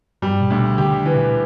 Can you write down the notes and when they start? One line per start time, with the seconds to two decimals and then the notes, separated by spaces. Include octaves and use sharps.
0.22 G2 G3
0.41 B2
0.50 D2
0.60 B2
0.78 D3 G4
0.97 D3
1.06 E3
1.15 B2